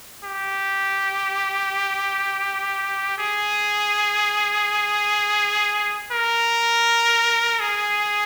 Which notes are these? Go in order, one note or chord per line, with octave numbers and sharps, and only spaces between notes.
G4
G#4
A#4
G#4